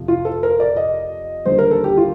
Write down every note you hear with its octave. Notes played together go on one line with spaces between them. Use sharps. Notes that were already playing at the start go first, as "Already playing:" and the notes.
Already playing: F2 C3 F3
F4
A4
A#4
D5
D#5
D#2 D3 G3 C5
A#4
A4
G4
F4